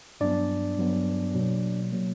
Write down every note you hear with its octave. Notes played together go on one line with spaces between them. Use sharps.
G2 F#3 B3 D4 D5
G2 F#3 B3
B2 F#3 A#3
B2 F#3 A#3